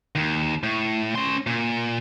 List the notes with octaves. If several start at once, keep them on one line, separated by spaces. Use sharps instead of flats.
D#2
A2
C#4 C6
A#2